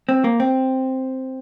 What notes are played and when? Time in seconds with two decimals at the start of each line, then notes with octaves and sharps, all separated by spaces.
0.09 C4
0.24 A#3
0.40 C4